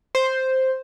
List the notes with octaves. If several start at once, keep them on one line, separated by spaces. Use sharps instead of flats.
C5